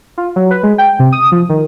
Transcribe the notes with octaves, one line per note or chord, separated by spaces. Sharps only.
F4
F#3
B4
G#3
G5
C3
D#6
F3
D#3